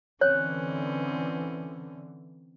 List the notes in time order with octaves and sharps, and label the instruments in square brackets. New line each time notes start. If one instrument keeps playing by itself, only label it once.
[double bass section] D3 E3 [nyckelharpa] C4 C#4 [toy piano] C#5 [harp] F#6